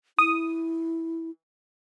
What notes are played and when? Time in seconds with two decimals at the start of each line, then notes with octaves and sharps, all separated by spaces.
0.19 E4 D#6